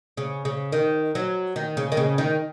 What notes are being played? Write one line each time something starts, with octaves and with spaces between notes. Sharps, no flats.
C#3
C#3
D#3
F#3
D#3
C#3
D#3
C#3
D#3